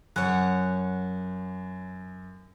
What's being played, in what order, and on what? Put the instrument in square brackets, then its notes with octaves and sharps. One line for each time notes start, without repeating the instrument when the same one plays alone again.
[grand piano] F#2 [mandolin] C#5 F#5